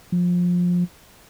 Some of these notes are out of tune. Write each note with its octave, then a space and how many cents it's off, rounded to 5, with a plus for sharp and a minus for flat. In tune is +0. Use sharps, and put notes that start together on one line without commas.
F3 +20